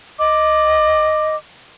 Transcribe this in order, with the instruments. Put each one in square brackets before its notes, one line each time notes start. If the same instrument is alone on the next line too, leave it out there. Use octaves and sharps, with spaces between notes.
[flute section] D#5 D6